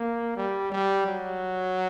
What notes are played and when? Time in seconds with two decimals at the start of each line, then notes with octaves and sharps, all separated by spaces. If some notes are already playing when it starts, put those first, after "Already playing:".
Already playing: A#3
0.36 G3
0.72 G3
1.07 F#3